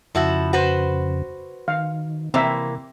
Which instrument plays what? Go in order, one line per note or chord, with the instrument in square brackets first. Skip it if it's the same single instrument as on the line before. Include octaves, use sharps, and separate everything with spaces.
[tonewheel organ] F2 C#3 [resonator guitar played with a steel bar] F3 E4 F#4
[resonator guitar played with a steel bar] F#4 B4 C5
[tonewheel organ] D#3 [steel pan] F5
[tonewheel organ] C3 [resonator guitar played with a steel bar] E3 A#3 [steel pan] C4 E5